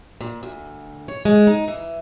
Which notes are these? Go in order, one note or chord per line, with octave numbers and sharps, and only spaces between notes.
A#2
D2
C#5
G#3
D#4
E3